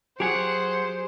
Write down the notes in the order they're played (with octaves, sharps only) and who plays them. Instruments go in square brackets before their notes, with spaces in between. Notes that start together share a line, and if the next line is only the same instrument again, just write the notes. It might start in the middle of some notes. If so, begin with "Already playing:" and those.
[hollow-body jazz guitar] F#3 [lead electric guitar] G4 G#4 [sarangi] C5 [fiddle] F#5